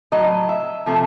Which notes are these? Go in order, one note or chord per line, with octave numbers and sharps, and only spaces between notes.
A2 F#3 D#5
E5
C3 F3 A3